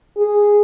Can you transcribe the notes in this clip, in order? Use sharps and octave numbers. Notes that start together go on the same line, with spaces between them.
G#4